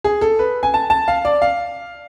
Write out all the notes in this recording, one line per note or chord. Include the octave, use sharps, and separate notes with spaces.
G#4
A4
B4
G#5
A5
A5
F5
D5
F5